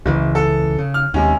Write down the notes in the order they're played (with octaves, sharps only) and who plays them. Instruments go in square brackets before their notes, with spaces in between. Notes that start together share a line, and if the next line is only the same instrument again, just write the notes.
[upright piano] F#1 [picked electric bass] C#2 C#3 E3
[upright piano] A4
[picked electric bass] C#3
[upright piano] F6
[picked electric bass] D#2 [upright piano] C3 G#3 C#4